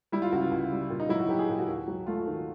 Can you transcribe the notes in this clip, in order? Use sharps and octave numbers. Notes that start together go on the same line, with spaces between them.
G3 E4
F4
C#2 F#4
F4
C#2
G3
A#2 F4
D#4
F#3 E4
F#4
F#3 G4
G#4
A#2 G4
F#4
D#2
F#3
A3 F4
D#3